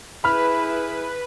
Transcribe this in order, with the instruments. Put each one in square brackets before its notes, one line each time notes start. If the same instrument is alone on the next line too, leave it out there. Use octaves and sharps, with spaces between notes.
[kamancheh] E4 G#4 [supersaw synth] B4 [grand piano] B5 F6